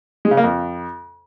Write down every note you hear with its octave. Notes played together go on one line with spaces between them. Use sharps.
G#3
C#3
A#3
F2